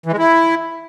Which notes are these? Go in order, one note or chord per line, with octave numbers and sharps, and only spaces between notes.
E3
G#3
E4